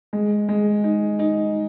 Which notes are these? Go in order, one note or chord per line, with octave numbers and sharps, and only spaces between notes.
G#3
G#3
D#4
D#4